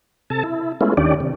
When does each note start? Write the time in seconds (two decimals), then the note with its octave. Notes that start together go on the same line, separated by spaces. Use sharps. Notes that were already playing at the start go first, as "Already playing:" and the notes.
0.30 C3 A4 A5
0.44 E4
0.81 G#3 A3 B3 C#4 E4 F4
0.97 D#2 D#3 C#4 D4 G4 D5
1.20 C3